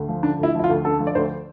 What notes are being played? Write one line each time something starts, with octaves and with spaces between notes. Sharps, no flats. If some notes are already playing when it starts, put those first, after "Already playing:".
Already playing: D2
F3
D3 D4
D2 E4
F3 E4
F4
D2
D3 A4
F3
D5
D2 C5